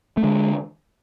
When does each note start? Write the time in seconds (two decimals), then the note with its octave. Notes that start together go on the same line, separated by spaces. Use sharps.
0.17 A3
0.23 D3 G#3